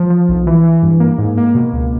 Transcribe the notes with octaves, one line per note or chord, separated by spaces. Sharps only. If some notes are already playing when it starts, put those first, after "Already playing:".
Already playing: F3
F3
B1
E3
E3
G2
A#3
G#2
A#3
B2
C#2